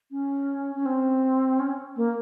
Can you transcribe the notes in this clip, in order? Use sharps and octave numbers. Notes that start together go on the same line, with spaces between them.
C#4
C#4
C4
C#4
A#3